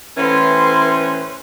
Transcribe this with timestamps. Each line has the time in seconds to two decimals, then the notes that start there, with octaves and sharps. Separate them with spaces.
0.18 A2 E3 C#4 B4 C5